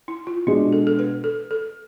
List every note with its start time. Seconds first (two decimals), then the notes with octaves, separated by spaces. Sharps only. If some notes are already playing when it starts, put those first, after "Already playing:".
0.08 E4
0.27 F4
0.47 B2 G#3 D4 E4
0.73 A4
0.87 A4
0.99 B4
1.24 A4
1.51 A4